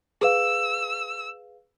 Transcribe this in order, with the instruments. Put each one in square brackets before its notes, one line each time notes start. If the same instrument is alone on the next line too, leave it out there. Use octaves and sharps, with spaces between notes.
[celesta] G#4 B4 F5 [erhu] E6